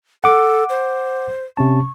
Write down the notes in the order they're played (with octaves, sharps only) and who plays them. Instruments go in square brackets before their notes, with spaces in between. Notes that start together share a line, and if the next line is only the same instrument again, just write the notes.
[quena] A4 [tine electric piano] F#5 D6
[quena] C5
[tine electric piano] C3 C#4 A5 [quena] C#6